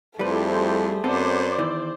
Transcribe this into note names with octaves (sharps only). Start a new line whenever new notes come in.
F2 G3 A3 E4 G4 G#4 B4 C5
F#2 B3 C4 A4 C5 D5
E2 D#3 E3